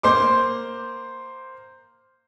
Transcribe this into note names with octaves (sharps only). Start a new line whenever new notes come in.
A#3 C5 C6 D6